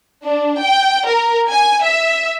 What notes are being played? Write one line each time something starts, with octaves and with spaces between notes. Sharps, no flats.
D4
G5
A#4
G#5
E5